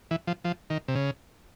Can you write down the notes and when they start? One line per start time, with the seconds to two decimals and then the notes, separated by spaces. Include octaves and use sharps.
0.11 E3
0.27 F3
0.45 F3
0.70 D#3
0.88 C3
0.95 C#3